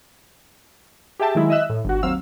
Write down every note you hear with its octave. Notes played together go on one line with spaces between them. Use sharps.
G4 G#4 E5 G5 A5
D#3 F#3 G#3 E4
D#5 E5 E6 F#6
A2
G1 F#4
D#2 F#3 C4 F5 E6